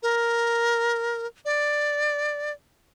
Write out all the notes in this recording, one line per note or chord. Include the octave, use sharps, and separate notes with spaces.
A#4
D5